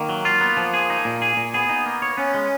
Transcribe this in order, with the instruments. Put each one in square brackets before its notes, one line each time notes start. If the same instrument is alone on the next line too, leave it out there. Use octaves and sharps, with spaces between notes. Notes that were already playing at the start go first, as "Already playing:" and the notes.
Already playing: [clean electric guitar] D#3 [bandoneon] A#3
[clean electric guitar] F#3
F4
B3
F3
G#4
D#4
A#2
G#4
A#2
[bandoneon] B3 [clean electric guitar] G#4
[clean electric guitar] D#4
A#3
C#5
[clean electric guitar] B3 [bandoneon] C#4
[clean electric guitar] G#3